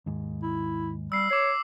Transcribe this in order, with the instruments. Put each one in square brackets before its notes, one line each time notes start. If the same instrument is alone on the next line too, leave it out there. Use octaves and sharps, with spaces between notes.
[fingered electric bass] D#2 G#2
[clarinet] E4
[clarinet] G3 [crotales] E6 C7
[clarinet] C#5 [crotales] D6 C7